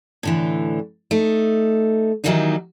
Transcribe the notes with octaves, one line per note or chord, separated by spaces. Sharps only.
A2 D3 E3
A3 D#4
D#3 E3 F#3 G3 A#3 D#4